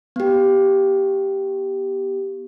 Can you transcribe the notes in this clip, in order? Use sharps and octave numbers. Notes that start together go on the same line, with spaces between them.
B3 G4